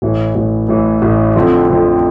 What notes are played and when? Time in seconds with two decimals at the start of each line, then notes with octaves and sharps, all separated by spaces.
0.02 A1 A2 E3
0.35 A1 A2 E3
0.68 A1 A2 E3
1.02 A1 A2 E3
1.35 F2 D3 F3 A3 C4
1.68 F2 D3 F3 A3 C4